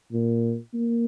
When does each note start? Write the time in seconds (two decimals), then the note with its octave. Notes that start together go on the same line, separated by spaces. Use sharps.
0.12 A#2
0.74 A#3